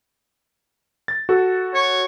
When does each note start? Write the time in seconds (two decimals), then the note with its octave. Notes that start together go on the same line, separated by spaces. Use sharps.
1.08 A6
1.29 F#4 A4
1.74 C#5